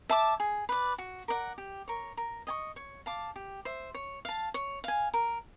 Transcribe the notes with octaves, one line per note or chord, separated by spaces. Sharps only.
E5 A5 D6
G#4
B4 D5
F#4
A#4 D5 F#5
G4
A#4 C#5
A#4
D#5 G#5 C#6
C#5
F5 A5 D6
G4
C5 E5
C#5
F5 A5
C#5
F5 G#5
A#4